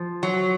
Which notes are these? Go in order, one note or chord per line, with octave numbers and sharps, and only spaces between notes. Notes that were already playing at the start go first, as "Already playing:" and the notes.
Already playing: F3
F#3